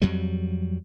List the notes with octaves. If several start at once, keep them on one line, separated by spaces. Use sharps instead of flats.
F2 F#3 G3